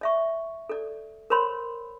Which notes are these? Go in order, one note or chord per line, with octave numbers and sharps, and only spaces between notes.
D5 E5 C#6
A4 D5
A#4 C5 C#5 B5 C6